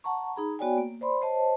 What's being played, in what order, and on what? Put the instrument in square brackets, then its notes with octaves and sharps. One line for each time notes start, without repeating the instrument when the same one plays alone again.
[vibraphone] F#5 A5 A#5 C#6
D#4 G#4 A#5 B5
B3 F#4 C#5 D5 G5 G#5
A#3
C5 D5 B5 C6
C5 C#5 D#5 A5